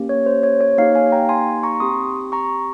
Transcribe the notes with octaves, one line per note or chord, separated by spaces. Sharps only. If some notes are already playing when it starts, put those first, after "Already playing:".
Already playing: A#3 C#4 G4
C#5
C5
C#5
C#5
A#3 D#4 G4 C#5 F5
F5 G#5
G5 A#5
G#5 C6
A#5 C#6
C4 G4 C6 D#6
A#5 C#6